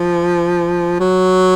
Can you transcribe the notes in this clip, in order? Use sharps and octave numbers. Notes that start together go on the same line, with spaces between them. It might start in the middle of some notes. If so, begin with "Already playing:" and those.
Already playing: F3
F#3